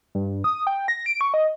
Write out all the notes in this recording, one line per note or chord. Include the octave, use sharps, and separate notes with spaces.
G2
D#6
G5
A#6
D7
C#6
D#5